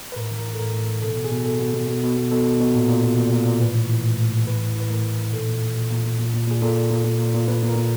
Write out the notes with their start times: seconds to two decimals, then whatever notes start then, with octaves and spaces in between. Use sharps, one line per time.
0.12 B4
0.16 A2 A#4
0.31 E3
0.38 A#4
0.45 E3
0.53 A4
0.59 A2 A#4
0.74 A2
0.89 E3
1.02 B2 A4
1.17 B2
1.25 G#4
1.32 B2
1.45 B2 A4
1.60 B2
1.74 B2
1.88 B2
2.03 B2
2.17 B2
2.31 B2 A4
2.46 B2
2.60 B2
2.75 A#2
2.88 A#2
3.03 A#2
3.17 A#2
3.32 A#2
3.46 A#2
3.60 A2 B4
3.75 E3
3.89 E3
4.03 A2
4.18 A2
4.33 E3
4.47 A2 B4
4.61 E3
4.75 E3 B4
4.90 A2 A#4
5.04 A2
5.18 E3
5.33 A#2 A4
5.47 A#2
5.62 A#2
5.76 A#2
5.90 A#2
6.04 A#2
6.19 A#2
6.33 A#2
6.47 A#2 G#4
6.62 A#2 A4
6.76 A#2
6.90 A#2
7.04 A#2
7.19 A#2
7.34 A#2
7.48 A#2 B4
7.62 A#2
7.69 A#4
7.76 A#2